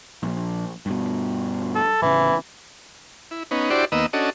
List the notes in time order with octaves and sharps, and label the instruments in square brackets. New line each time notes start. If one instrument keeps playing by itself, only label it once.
[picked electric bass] A#1
G2 B2
[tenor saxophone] A4
[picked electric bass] D1 A1 C#3 [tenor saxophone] E3
[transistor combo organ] E4
B3 C#4 D#4
D4 E4 F#4 G4 C5 D5
D#2 A#3 B3 D#5 E6
C#4 D4 F#4 A4 D#5